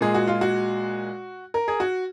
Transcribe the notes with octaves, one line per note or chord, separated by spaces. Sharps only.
A#2 G#3 G#4
F#4
F4
F#4
A#4
G#4
F#4